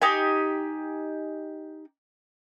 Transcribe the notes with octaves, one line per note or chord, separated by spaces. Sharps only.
D#4 G4 G#5